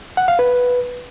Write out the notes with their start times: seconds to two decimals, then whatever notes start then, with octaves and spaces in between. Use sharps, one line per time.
0.17 F#5
0.28 F5
0.39 B4